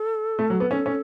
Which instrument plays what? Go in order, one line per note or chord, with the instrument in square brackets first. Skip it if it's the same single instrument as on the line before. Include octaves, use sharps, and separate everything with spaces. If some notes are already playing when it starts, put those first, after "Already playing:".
Already playing: [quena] A4
[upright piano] A3
F#3
B3
[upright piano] C#4 [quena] A4
[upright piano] C#4